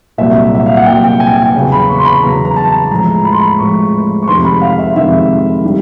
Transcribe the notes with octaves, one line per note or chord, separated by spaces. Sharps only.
C2 A#2 F#3 E5
E5
F5
F#5
C2 A#2 F#3 G5
G5
G#5
G5
E2 C#3 F#3
B5
C#6
C6
B5
E2 C#3 F#3 A#5
A#5
A5
A2 F3 G#3 A#5
B5
C6
B5
A2 F3 G#3 C#6
C#6
F2 C3 D#3 G#3 C6
B5
F5
E5
F2 C3 D#3 G#3 E5
D#3 G3